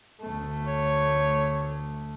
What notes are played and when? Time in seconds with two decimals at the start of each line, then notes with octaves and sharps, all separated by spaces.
0.22 D2 A3
0.67 C#5